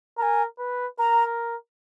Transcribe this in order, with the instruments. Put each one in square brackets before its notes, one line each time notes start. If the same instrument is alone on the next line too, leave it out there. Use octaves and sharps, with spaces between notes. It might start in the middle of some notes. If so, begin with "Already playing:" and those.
[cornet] A#4 [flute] A#5
[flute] G#5
[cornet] B4
[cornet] A#4 [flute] A#5